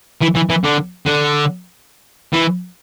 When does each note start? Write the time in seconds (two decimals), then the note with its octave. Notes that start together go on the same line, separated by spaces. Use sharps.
0.22 E3
0.35 E3
0.50 E3
0.64 D3
1.06 D3
2.33 E3